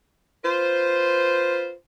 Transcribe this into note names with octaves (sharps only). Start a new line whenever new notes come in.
F4 B4 C5